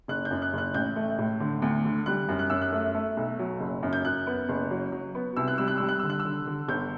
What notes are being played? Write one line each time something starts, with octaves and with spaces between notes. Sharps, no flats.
F#1 F#6
G6
F#2
F#6
F#1 F#6
A1 G6
A3
A2
D3
D2
D3
G3 F#6
F#2
F#6
F#2 E6
F#6
A3
A3
B1
F#3
F#1
F#2
G6
F#2 F#6
B3
F#1
F#3
F#3
B3
C2 E6
F#6
G3 E6
F#6
G3 E6
F#6
D3 E6
F#6
E6
D3
D3
G1 G6